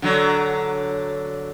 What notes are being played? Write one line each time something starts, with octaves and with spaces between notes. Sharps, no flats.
D3 F#3